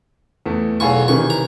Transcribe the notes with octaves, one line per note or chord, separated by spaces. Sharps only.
E2 A3
B1 E2 A4 F5 G#5 C#6
C3 D#3 E3 C#6
A#5